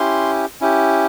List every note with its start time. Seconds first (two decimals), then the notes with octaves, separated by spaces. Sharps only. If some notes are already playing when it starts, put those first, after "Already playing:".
Already playing: C#4 E4 G4 C6
0.61 C#4 E4 G4